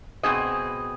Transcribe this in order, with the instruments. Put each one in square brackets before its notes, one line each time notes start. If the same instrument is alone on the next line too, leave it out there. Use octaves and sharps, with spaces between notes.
[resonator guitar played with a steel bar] B2 F3 C4 G#4 D#5